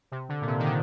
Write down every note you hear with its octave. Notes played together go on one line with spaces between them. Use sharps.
C3
D3
A#2
C3
D#3
D3